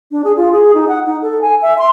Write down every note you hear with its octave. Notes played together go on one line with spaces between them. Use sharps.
D4
G#4
F4
G#4
D#4
F#5
D#4
A4
G#5
E5
C6